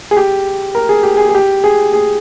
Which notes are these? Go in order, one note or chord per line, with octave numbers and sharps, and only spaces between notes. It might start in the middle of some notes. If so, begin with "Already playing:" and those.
G#4
G4
A#4
G#4
G4
G#4
G#4
G4
G#4
G#4